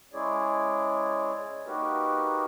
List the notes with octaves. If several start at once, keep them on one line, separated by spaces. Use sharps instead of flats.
G#3 C#4 E4 G#4 C#5 D5
A#3 D#4 F#4 G4 A#4 B4